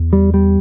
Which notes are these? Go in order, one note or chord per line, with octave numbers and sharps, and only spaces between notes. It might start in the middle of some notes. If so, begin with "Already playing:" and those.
Already playing: E2
G3
G3